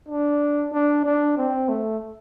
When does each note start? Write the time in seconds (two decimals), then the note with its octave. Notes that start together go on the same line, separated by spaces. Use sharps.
0.09 D4
0.73 D4
1.05 D4
1.37 C4
1.69 A3